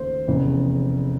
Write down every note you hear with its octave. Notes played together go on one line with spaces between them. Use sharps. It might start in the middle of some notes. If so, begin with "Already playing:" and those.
Already playing: D#2 C#3 A3 C5
F1 E2 C#3